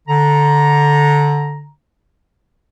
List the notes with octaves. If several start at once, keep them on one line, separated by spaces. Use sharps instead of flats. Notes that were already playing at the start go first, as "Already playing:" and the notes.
D3 A#5